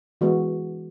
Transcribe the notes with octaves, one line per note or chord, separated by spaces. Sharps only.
E3 G#3 B3 F#4